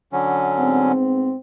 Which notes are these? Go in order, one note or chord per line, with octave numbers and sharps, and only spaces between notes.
D3 F#3 C#4
G#2 B3 C4